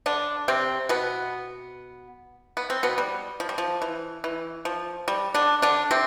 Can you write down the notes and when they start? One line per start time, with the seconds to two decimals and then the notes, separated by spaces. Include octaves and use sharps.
0.06 D3 D4
0.48 C3 C4
0.89 B2 B3
2.57 B3
2.70 C4
2.83 B2 B3
2.98 G3
3.40 F3
3.49 G3
3.58 F3
3.82 E3
4.24 E3
4.65 F3
5.08 G3
5.34 D3 D4
5.62 D3 D4
5.91 C3 C4